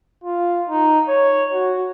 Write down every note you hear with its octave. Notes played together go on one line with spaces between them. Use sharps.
F4
D#4
C#5
F#4